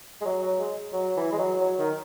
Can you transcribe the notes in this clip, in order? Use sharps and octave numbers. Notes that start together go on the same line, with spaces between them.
G#3
F#3
F#3
G#3
F#3
E3
G#3
F#3
F#3
D#3